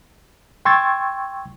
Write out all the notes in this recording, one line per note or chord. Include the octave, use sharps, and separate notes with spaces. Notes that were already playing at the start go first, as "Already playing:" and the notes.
G5 C6 C#6 E6 G#6 A6